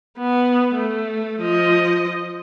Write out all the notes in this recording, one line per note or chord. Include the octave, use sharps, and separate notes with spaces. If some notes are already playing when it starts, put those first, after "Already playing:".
B3
A3
F3 D#5